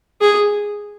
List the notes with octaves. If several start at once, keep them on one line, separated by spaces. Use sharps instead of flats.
G#4